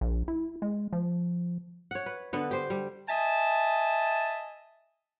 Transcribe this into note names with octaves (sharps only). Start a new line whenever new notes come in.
A#1
E4
G#3
F3
C#5 F#5
B4
D3 B3 A4
G4 C5
G3
D#5 E5 G#5 A5